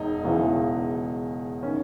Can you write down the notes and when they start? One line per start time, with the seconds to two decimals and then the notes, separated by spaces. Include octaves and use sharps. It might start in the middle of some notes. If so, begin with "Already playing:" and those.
Already playing: E1 D#4
0.23 E1 E2 C#3 E3
1.63 D#3 C#4